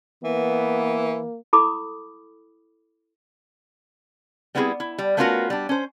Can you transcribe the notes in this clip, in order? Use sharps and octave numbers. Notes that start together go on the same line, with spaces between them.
E3 A#3 B3
E4 A4 B5 D6 D#6
G3 B3 C4 E4 F4 G#4
E4
G3
A3 B3 C#4 F4 F#4 A#4
G3 D4
C#4 C5